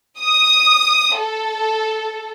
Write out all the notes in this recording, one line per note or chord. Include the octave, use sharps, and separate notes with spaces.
D#6
A4